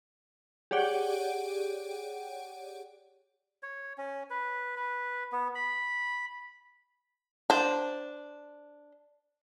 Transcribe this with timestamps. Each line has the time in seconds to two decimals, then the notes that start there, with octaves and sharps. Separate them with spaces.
0.71 G4 G#4 C#5 D5 F#5 G5
3.63 C#5
3.98 C#4
4.30 B4
4.76 B4
5.32 B3
5.55 B5
7.50 D4 C5